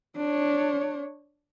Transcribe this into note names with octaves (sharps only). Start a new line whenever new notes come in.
D4 C#5